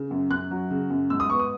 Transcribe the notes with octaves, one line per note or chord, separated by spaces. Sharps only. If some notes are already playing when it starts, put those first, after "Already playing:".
Already playing: C#3
F#2
F#2 F#6
F#3
C#3
F#2
G#2 E6
D#6
B3 C#6
D#6